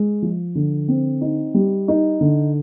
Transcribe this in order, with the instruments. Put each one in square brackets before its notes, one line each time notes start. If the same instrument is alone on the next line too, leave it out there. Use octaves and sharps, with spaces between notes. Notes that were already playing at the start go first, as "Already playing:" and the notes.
Already playing: [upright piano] G#3
F3
D3
C4
D#4
G3
D#4
D3